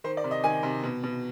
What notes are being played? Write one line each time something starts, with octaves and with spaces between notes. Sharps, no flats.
D#3 C5
D5
C3
D#5
D#3 G#5
C3
B2
B2